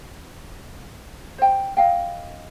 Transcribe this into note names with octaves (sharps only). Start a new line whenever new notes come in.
C5 G5
D#5 F5 G5